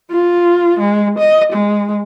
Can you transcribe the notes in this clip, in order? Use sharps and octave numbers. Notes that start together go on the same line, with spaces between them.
F4
G#3
D#5
G#3